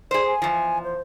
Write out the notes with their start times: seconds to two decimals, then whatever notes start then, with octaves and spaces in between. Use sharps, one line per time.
0.11 G#4 C5 D5
0.27 G#5
0.42 E2 F3
0.84 C5